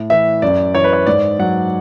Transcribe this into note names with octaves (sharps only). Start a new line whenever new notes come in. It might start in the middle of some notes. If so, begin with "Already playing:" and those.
Already playing: A2
E3 E5
F#2 D5
E3 C#5
B4
C#5
G#2 D5
F#3 F#5